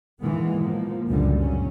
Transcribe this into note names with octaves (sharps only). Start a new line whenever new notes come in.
A#2 E3 G#3 A#3 B3
F3 A#3
G1 C#2 F#2 A#2 D3 G3
F#3 C#4